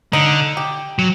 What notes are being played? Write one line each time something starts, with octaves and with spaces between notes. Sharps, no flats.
D3 D#4
G4
F#3